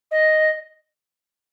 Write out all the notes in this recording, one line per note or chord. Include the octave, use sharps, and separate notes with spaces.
D#5